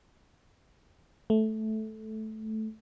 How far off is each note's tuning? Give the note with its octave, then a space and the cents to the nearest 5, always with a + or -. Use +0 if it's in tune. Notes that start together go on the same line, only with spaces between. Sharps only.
A3 -10